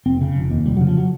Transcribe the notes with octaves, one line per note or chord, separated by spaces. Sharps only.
F1 C4
C#3
F1
D#2
F1 G3
C#3 F#3
F3
F#3